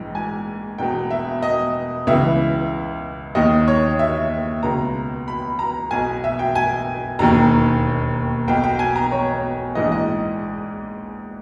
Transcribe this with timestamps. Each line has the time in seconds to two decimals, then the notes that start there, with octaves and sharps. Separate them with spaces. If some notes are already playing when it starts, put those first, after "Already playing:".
Already playing: A#1 G#2 E3
0.15 G#5
0.78 E1 E2 B2 G5
1.11 E5
1.43 D#5
2.07 C#2 C#3 E3 E5
3.35 D#2 D#3 D#5
3.68 C#5
3.99 E5
4.63 C#2 B2 A#5
5.28 B5
5.59 A#5
5.91 B1 B2 G#5
6.24 E5
6.39 G5
6.55 G#5
7.19 E1 D#2 D#3 A#5
8.48 B1 B2 G5
8.64 G5
8.79 G#5
8.96 A#5
9.12 C#5
9.75 A#1 G#2 E3 D#5
9.92 D#5